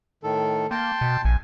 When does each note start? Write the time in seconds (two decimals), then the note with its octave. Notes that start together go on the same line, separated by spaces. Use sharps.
0.23 A2 D#3 A4
0.71 A#3 G5 A5 C6
1.01 B2
1.25 A#1 G#5